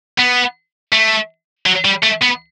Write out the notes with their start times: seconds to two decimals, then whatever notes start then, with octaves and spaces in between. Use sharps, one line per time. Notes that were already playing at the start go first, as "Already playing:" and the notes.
0.18 B3
0.92 A3
1.66 F#3
1.85 G3
2.03 A3
2.22 B3